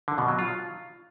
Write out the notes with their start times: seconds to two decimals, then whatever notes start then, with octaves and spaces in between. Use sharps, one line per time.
0.08 D3
0.18 B2
0.28 F#3
0.39 F4